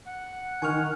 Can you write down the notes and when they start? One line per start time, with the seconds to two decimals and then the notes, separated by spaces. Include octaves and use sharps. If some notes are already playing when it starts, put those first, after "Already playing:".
0.06 F#5
0.62 D#3 G#5 C#6 F6